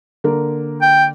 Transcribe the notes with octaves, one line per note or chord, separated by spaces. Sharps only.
D3 A#3 A#4
G5